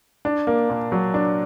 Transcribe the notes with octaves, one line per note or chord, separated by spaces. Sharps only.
D4
A#3
A#2
F#3
D4